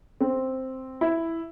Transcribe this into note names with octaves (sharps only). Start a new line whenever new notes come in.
C4
E4